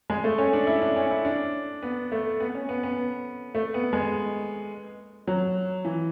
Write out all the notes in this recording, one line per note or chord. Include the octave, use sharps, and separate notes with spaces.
G#3
A3
C#4
D4
E4
D4
C#4
E4
D4
B3
A3
B3
C#4
B3
B3
A3
B3
G#3
F#3
E3